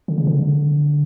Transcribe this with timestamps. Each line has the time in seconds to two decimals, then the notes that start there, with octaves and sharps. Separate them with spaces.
0.08 D3
0.18 C#3
0.27 D3